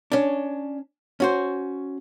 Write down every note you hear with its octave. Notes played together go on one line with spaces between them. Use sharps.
C#4 D4
C#4 F#4 C5